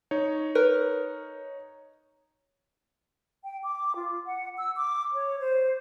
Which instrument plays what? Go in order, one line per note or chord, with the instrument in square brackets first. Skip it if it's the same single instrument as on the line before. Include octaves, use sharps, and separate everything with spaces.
[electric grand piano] D#4 C#5
[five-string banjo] A#4 B4
[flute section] G5
D6
F4
F#5
E6
D6
C#5
C5